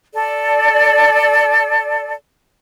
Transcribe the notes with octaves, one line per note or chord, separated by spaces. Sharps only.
A4 D5